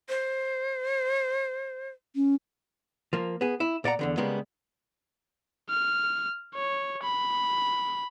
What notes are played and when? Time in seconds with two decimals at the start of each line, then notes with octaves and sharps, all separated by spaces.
0.09 C5
2.16 C#4
3.13 F3 A#3
3.41 B3 G#4
3.60 E4
3.84 A#2 D5 F#5 A#5
3.99 E2 D3 D#3
4.17 C#3 G3 G#3 A#3 B3
5.70 F6
6.55 C#5
7.03 B5